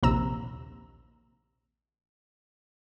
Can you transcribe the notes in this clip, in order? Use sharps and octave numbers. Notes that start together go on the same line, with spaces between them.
A#1 D#2 C3 A#5 E6 E7